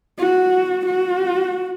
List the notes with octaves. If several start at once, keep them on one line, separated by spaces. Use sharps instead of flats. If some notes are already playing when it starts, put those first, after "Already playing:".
F#4
F#4